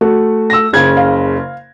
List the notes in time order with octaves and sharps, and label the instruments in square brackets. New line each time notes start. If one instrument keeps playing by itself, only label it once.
[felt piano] A3 F#4
[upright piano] E6 A#6
F#1 C#3 G#6
[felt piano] F5